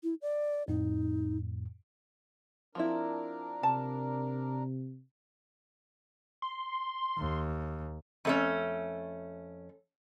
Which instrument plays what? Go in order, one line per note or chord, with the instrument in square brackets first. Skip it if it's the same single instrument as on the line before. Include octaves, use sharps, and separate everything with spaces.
[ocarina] E4
D5
[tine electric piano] F2 A2 [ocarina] D#4
[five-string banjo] F3 C4 E4 [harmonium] D4 A#4
[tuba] C3 [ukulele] A5
[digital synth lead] C6
[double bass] D#2
[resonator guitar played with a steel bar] F2 A3 C#4